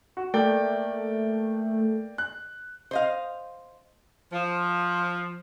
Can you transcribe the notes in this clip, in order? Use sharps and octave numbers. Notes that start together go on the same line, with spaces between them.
F#4
A3 A#3 D5 G5
F#6
C5 D#5 F5
F3